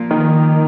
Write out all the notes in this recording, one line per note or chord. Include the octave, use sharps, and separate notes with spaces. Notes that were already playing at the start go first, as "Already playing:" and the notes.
Already playing: A#2 F3 A#3
D#3